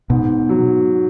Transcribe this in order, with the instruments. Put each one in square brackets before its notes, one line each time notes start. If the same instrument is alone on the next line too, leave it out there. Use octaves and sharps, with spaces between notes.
[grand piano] G#2 [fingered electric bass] B2
[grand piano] F#3